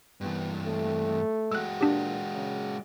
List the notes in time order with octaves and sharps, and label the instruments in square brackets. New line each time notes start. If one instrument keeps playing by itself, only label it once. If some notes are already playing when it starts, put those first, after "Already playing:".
[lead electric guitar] G2 E3 [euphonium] B3
[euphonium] A3
[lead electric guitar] G#3 F#4 [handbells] E6 F#6
[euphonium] A#2 [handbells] D4 G4
[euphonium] C#3